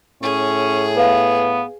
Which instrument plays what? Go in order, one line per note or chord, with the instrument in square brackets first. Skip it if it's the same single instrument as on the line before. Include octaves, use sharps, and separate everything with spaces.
[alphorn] A2 [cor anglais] C#4 [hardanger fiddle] G#4
[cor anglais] B3 [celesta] B4 F5